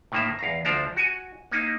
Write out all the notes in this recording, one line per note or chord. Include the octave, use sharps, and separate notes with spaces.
A2 D#3 A#3 E5
E2 F5 A#5
D2 F3 D4 C5 A#5
F#4 G#5
A#3 D#4 E4